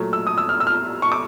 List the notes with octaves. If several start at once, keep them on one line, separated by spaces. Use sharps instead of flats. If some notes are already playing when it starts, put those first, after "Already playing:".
Already playing: A#2 F#3 A3
E6
D#6
E6
F6
E6
F6
C#6
D6